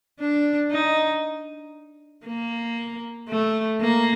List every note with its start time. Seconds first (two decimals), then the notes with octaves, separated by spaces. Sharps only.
0.20 D4
0.71 D#4
2.26 A#3
3.29 A3
3.80 A#3